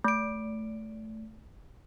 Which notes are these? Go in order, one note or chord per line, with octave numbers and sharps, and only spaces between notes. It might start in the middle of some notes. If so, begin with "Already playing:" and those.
A3 D7